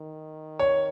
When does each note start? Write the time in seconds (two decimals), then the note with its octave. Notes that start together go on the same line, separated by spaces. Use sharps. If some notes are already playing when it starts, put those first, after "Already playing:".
Already playing: D#3
0.59 C#5